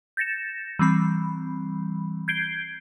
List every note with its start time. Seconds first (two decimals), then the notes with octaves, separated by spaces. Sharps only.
0.17 G6 A6 A#6 C#7 E7
0.79 E3 G3 C4 B5
2.28 G6 G#6 C7 D7 G7